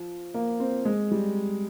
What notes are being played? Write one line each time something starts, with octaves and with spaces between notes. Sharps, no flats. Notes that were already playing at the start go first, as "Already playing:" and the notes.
Already playing: F3
A#3
C4
G#3
G3